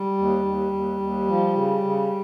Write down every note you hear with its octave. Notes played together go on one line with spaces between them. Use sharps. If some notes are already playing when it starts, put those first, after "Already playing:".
Already playing: G3
D#2
D#2
D#2
D#2
F3
C#3
C#3